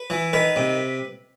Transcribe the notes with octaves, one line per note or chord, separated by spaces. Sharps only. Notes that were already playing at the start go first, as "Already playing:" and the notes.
Already playing: B4
E3
D#3 B4
C3